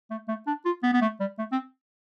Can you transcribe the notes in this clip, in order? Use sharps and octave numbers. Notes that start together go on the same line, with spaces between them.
A3
A3
D4
F4
B3
B3
A3
G3
A3
C4